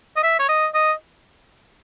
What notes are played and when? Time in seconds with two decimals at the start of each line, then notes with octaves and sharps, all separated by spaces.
0.17 D#5
0.23 E5
0.39 C#5
0.49 D#5
0.74 D#5